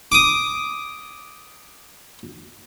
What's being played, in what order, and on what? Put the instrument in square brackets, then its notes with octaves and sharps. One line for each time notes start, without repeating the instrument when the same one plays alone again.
[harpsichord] D6 D#6